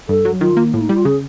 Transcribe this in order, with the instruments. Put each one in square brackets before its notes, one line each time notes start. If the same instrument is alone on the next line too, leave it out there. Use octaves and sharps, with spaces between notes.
[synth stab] G2 [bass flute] A4
[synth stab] F#3
[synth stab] D#3 [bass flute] F4
[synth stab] A#3
[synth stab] A2 [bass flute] E4
[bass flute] D#4
[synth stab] G3 [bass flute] E4
[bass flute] F4
[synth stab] C#3 [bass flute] G#4